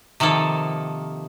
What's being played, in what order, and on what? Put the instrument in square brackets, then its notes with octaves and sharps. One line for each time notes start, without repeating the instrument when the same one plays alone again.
[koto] C3 D#3 F3 A#3 A4